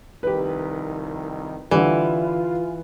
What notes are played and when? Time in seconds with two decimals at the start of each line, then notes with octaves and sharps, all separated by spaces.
0.23 C2 F2 D#3 G4 B4
1.71 D3 E3 G3 F4